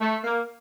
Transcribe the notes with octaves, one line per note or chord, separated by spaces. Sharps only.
A3
A#3